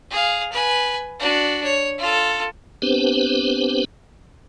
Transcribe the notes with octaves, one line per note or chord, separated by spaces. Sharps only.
G#4 F5
B4 G#5
D4 F#4
C#5
F4 A4
B3 C4 D4 G4 B4 C5